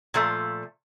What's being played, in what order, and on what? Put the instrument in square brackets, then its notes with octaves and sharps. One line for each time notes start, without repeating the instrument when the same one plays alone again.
[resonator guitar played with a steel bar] A#2 F3 A3